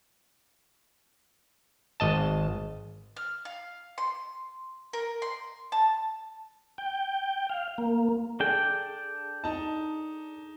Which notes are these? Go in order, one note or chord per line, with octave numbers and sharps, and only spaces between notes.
G#1 D#5 A5
F6
F5
C6
A#4
C6
A5
G5
F5
A#3
D4 G#4 A4 G5
D#4 A5